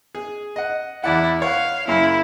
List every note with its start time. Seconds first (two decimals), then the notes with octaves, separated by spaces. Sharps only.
0.15 G#4
0.56 D#5 F#5
1.04 E2 E4 D5 F#5
1.42 C#5 F5 F#5
1.88 F#2 C#3 A#3 E4